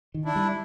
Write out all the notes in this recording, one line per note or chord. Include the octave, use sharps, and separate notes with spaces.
D#3
D4 E4
G3